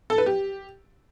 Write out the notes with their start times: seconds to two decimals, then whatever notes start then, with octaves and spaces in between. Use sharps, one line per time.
0.10 A4
0.18 B4
0.26 G4